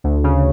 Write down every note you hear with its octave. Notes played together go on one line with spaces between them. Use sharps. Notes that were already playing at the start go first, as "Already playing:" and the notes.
D2
C#3